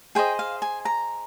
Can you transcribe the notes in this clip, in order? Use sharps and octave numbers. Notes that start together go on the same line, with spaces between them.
G#4 C5 D#5 G5
F5
G#5
A#5